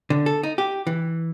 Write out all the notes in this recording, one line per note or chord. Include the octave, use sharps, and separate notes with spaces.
D3
A4
D#4
G4
E3